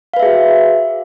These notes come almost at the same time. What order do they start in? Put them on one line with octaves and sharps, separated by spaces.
F5 B4 E5 G#4 F#4